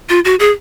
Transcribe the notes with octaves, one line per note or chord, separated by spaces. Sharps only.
F4
F#4
G#4